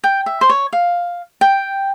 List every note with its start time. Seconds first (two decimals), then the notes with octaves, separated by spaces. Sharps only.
0.04 G5
0.26 E5
0.41 C5
0.50 C#5
0.73 F5
1.41 G5